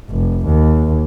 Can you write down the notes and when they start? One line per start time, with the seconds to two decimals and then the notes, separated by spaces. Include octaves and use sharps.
0.11 F1
0.46 D#2